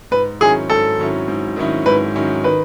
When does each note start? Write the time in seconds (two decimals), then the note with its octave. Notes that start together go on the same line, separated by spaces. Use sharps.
0.11 G#2 B4
0.40 D#3 F#3 C#4 E4 G#4
0.69 G#2 A4
0.98 D#3 F#3 C#4 E4
1.28 G#2
1.56 D#3 F#3 C#4 E4
1.86 G#2 B4
2.15 D#3 F#3 C#4 E4
2.44 D#3 B4